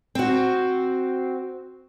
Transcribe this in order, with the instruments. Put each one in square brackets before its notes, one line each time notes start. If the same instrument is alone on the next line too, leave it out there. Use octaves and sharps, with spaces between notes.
[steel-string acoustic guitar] C4 F#4